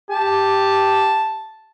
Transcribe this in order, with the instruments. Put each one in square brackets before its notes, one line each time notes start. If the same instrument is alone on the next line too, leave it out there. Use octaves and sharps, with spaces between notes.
[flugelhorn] G4 [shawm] A5